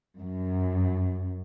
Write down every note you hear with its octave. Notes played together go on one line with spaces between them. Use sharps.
F#2